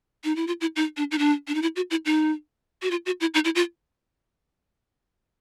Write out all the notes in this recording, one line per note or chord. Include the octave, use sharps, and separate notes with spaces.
D#4
E4
F4
E4
D#4
D4
D#4
D4
D4
D#4
E4
F#4
E4
D#4
F#4
F4
F#4
E4
D#4
E4
F4